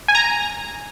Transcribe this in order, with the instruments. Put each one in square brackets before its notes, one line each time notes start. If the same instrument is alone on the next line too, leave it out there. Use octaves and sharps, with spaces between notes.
[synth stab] G#5
A#5